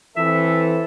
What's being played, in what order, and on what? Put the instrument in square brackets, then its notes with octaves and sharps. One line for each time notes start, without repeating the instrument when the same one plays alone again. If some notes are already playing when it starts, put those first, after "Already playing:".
[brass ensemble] E3 C4 A4 [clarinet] E5